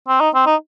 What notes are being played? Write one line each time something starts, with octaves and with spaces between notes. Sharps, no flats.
C4
D#4
C4
D#4